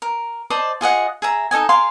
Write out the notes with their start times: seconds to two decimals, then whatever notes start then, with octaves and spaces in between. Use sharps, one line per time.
0.02 A#4
0.50 C5 D5 D#5 A5
0.81 F4 G#4 D#5 F#5
1.22 G#4 E5 A#5
1.51 D#4 A4 D#5 G#5
1.69 G#4 A#4 F5 C6